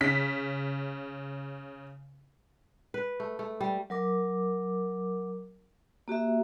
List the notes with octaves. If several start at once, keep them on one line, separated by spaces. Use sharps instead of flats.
C#3 B6
B4
A3
A3
G3
F#3 A#4 D6
A#3 F#4 G4 E5